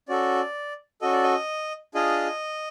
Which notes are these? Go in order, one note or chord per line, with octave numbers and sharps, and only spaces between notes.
C#4 F#4 A4 D5
C#4 F#4 A4 D#5
D5
D#5
D4 F4 G#4 D#5